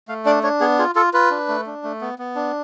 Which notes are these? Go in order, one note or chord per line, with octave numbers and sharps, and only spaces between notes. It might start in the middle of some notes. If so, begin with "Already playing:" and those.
A3 F5
D4 D5
D4 C#5
B3 G#4
F4 G#4
F4 A4
F4 B4
D4
A3
D4
A3
B3
B3
D4